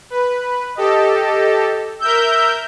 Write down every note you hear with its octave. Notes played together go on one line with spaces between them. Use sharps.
B4
G4 A4 D#5
A#4 E5 E6 G6